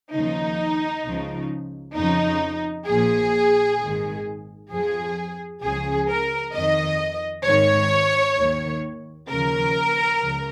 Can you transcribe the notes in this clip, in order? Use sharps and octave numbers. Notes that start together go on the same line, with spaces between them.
D#2 C#3 F3 D#4
C#2 C#3 F3
F2 C#3 F3 D#4
A#1 A#2 F3 G#4
G#1 G#2 D#3
F2 F3 G#4
C#2 C#3 F3 G#4
A#4
F2 D#3 D#5
G#1 G#2 D#3 C#5
D#2 D#3
D#2 C#3 F3 A#4
C#2 C#3 F3